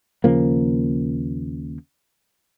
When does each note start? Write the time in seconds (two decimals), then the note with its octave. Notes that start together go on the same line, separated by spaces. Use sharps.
0.24 D#2 C#3 F3 A#3